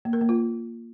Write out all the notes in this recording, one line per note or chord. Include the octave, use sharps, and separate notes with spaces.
A#3
A#4
A#3
F4